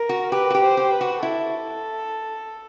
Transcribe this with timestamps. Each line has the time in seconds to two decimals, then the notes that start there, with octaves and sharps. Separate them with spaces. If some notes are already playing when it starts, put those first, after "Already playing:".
Already playing: A#4
0.09 F#4
0.32 G4 B4
0.50 F#4
0.54 G4
0.63 C5
0.77 G4
0.93 B4
1.01 F#4
1.23 E4 A4